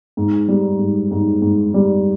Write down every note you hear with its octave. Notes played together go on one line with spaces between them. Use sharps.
G#2
G3
G#2
G#2
G#2
G3